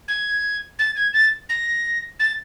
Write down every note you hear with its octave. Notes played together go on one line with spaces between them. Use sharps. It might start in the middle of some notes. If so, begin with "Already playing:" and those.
G#6
A6
G#6
A6
A#6
A6